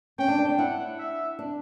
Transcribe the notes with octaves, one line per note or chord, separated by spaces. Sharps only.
C#4 G5
D4
D4
D4
E4 F#5
E5
D4